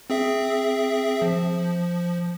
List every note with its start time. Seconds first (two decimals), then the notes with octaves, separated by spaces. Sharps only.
0.10 C4 G#4 E5
1.22 F3